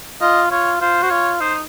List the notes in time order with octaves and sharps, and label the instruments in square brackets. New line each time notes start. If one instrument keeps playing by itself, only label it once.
[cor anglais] F4 [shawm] D#5
[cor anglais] F4 [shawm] C#5
[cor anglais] F4 [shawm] C5
[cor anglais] F#4 [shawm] C5
[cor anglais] F4 [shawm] C#5
[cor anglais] D#4 [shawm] C5